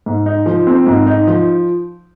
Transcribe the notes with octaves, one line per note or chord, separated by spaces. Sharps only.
G#2
D#4
F3
C4
G#2
D#4
F3